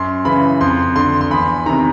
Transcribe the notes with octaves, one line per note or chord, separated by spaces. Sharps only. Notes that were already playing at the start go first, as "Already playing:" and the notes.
Already playing: F#2 C6
C#3 E3 B5
F2 C6
D3 C6
C6
E2 B5
C3 D#3 A#5